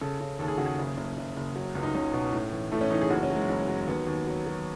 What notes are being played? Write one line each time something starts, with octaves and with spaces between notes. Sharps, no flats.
C#3 A4
C#3
D#2 A4
G#4
C#3 F#4
G#4
F#1
F#1
F#1
F#1
F#3
C#2
D#4
C#2 C#4
B2
A2
E3
A2 A3
C#4
E3 D#4
G#4
F#1 F#4
C#4
F#3
G#3
F#1
F#3
D#2 B3
D#2
F#3
F#3